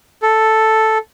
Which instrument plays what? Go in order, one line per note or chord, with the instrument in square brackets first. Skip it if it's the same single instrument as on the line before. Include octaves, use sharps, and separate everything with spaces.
[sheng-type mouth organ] A4